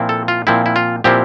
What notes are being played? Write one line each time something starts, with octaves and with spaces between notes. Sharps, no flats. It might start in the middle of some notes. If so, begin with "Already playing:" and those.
Already playing: A#2 F3 C4 E4
A4
F4
A#2 F3 C4 E4
E4
F4
A#2 F3 C4 E4 G4